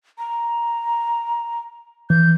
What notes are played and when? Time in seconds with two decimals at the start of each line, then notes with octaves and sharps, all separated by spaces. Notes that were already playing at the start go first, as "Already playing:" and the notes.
0.18 A#5
2.10 E3 G6